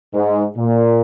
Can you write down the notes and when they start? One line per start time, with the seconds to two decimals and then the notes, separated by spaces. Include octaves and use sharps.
0.14 G#2
0.57 A#2